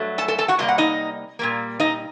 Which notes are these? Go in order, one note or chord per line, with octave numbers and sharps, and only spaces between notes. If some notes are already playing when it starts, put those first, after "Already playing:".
Already playing: G2 F#3 A3
A4 A5
A4 A5
A4 A5
F#4 F#5
C3 G3 A#3 D#5
F#5
D#4 D#5
A#2 G3 A#3
D#4 D#5